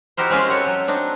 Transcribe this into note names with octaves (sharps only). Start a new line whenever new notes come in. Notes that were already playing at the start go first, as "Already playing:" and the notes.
D#4 E4 F#4 G4 A#4 C5
G#3 C4 C#4 F4 G4 G#4
A4 C#5 F#5
F#3
C4 D4 D#4